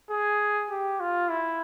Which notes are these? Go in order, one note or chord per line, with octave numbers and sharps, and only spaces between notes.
G#4
G4
F4
E4